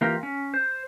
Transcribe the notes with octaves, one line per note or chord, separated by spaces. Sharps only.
E3 A#3 F4 G4 A#4
C#4
C5